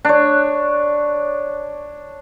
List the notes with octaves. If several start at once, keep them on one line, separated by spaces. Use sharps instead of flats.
D4 C#5